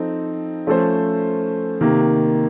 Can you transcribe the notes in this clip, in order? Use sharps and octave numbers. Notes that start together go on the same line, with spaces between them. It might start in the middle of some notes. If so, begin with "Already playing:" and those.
Already playing: F3 C4 D#4 A4
F3 A3 C#4 A4 C5
C3 D#3 A#3